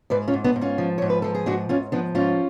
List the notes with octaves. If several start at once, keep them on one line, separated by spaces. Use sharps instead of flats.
G#2 B4 D5
C#4 F4
G#2
B3 D4
G#2
C#4 F4
F3
G#2 C#5
B4
F3 A4
G#4
G#2 D4 F#4
G#2 C#4 F4
F3 B3 D4
G#2 C#4 F4